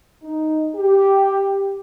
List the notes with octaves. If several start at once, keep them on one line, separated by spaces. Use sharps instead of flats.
D#4
G4